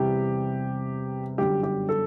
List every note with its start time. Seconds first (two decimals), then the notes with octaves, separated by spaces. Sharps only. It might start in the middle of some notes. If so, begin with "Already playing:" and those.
Already playing: E2 C3 G3 G4
1.38 G1 F#2 D3 G3 G4
1.63 G4
1.89 A4